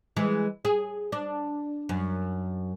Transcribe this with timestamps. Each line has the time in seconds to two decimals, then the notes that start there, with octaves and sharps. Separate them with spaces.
0.16 E3 G#3
0.65 G#4
1.12 D4
1.89 F#2